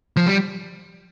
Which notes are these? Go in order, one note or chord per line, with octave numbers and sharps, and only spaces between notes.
F3
G3